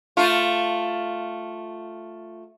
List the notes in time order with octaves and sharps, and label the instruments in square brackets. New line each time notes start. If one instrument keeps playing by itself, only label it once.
[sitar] A3 F4